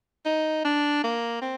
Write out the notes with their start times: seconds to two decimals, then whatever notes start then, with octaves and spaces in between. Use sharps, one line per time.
0.26 D#4
0.65 D4
1.04 A#3
1.42 C4